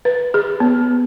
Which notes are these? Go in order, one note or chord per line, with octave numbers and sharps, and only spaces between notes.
B4
G#4
B3